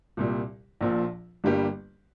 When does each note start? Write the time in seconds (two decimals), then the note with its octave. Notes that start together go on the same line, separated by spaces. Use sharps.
0.17 C2 A#2 G3
0.81 A#1 A#2 F3
1.44 G1 G2 G3 A#3 G4